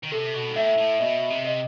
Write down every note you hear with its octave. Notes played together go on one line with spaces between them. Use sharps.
D#3
C3 A4
B2
G2
A2 E5
A2
B2 D#5
C3
D#5